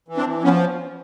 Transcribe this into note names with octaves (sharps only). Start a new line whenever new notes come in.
E3
C4 D4
E3
F3 B3 C#4